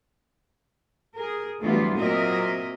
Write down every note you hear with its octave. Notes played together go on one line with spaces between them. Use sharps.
G#4 A#4
D2 E3 F#3 G3 B3 F4
A#2 F#3 C4 A#4 D#5 E5